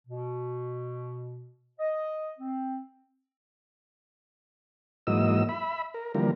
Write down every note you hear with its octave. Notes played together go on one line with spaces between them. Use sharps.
B2
D#5
C4
G#2 E3 F#3 A#3 D#5 E6
E5 B5
A#4
D3 E3 F3 G3 A#3 A#4